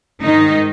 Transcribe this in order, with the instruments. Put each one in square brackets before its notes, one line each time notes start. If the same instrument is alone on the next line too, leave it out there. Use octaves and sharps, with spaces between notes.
[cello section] G#2 D#3 D#4